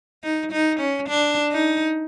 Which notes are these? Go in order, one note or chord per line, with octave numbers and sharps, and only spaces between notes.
D#4
D#4
C#4
D4
D#4